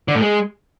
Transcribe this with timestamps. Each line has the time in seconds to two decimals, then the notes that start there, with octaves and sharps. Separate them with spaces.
0.08 D3
0.15 A2
0.22 G#3